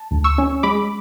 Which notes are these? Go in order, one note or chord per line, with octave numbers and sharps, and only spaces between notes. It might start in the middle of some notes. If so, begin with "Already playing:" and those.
Already playing: A5
D2
C#6 E6
C#4
G#3 B5 D6